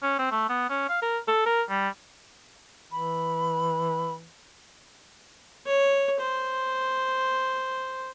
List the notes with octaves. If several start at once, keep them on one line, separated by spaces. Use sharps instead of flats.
C#4
C4
A3
B3
C#4
F5
A#4
A4
A#4
G3
E3 B5
C#5
C5